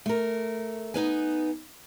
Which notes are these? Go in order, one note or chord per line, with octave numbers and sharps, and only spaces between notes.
A3 A#4
B3 D#4 B4 G#5